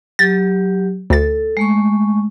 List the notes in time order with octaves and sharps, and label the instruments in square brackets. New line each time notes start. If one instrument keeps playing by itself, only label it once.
[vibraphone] F#3 G4 [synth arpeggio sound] A6
[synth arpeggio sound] D2 A6 [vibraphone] A4
[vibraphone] G#3 A3 C#6